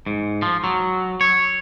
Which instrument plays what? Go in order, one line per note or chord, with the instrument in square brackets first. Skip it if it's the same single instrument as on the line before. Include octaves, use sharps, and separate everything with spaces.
[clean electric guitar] G#2
F3
F#3
C#5